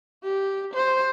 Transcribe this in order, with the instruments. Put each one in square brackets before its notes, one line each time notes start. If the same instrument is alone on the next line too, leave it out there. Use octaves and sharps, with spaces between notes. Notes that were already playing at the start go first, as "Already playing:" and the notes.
[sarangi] G4
C5